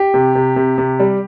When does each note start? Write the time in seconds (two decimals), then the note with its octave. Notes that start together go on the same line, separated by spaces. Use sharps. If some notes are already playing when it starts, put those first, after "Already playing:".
Already playing: G4
0.14 C3
0.35 C3
0.56 C3
0.78 C3
1.00 G3